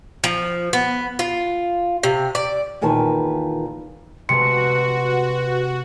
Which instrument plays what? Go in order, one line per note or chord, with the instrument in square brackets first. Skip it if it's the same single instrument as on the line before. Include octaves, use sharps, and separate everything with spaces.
[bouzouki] F3
B3
F4
C3
D5
[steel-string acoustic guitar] E2 A#2 D#3 B4 A5
[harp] C3 G#3 A3 [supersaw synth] F#4 [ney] B4 [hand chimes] C6 C#7